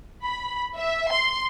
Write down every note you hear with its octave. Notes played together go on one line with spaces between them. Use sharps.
B5
E5
C6